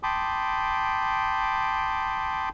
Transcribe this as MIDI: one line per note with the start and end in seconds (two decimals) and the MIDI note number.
0.03 2.49 79
0.03 2.49 81
0.03 2.49 83
0.03 2.49 84
0.03 2.49 86
0.03 2.49 87